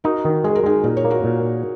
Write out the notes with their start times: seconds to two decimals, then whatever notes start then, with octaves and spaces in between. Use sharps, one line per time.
0.04 D#4 F#4 A#4
0.25 D#3
0.44 G#3 G#4
0.55 A#4
0.64 G#3 D#4 G#4
0.84 A#2 A#4
0.97 C#5
1.05 A#3
1.10 F#4 A#4
1.24 A#2